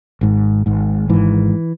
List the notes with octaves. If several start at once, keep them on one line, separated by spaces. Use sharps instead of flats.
G#1 G#2
G#1 G#2
G#1 G#2 E3